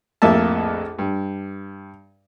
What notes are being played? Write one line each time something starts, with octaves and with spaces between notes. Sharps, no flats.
A#1 F2 A2 A#3 E5 A5
G2